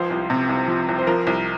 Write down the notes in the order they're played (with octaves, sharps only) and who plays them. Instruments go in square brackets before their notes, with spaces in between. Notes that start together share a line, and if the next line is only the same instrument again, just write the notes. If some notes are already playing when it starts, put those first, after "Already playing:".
Already playing: [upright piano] C#2 F3 C5
C2
C3
C2
F3
C2
C5
F3 A#4
C2